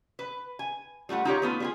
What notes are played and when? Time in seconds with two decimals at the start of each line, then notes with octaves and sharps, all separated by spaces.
0.19 B4
0.59 G#5
1.09 G3 A3 F4 F#5
1.25 D#4 F4 G4 C#5
1.42 A3 B3 F4
1.60 G3 F4 G#4